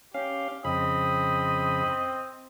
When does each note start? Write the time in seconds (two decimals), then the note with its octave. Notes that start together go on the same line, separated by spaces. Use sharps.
0.14 C#4 G4 F5
0.65 F2 C#3 C4 D#5 B5